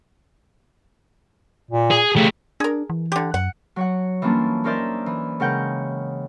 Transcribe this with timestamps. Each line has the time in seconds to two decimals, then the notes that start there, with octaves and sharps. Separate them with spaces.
1.71 A#2
1.91 G#4
2.16 C#3 A3 G4
2.60 D4 G#4 A#4
2.90 E3
3.12 D3 G4
3.34 F#2 F#5
3.76 F#3 C#5 F#5
4.22 E3 G3 A#3 C#4 D4 F4
4.64 C#4 D#4 A#4 C5 D5 E5
5.06 E3
5.40 C#3 G#3 A#4 F#5 G5 G6